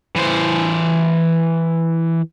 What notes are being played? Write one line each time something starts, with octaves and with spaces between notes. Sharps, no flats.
E3 C5